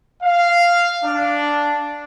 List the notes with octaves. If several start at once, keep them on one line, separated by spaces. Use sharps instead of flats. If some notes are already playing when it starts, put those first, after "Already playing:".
F5
D4